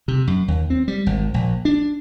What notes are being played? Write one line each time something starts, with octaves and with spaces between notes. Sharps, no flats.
C3
F#2
D#2
C4
G3
G#1
A#1
D4